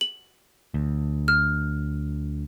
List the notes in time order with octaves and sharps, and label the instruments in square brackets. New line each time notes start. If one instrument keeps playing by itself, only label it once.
[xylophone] F#7
[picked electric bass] D2
[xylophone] F6